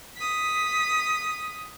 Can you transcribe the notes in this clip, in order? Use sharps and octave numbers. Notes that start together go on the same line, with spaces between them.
D#6 B6